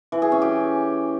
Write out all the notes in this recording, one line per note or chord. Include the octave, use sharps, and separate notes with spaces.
E3
G#4
C#4
G4